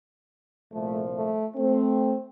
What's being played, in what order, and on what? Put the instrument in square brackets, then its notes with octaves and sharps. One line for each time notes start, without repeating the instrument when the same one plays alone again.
[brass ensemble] C2 A#2 F3 A3
A3
A3 C4